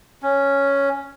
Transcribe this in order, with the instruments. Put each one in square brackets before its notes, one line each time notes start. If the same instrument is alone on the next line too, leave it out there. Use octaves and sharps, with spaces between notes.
[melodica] C#4